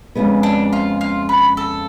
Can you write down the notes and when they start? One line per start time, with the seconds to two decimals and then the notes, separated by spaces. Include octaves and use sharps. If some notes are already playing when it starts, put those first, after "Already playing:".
0.15 F2 C#3 G#3 B3
0.43 D4
0.73 F4
1.01 F4
1.29 B4
1.57 A4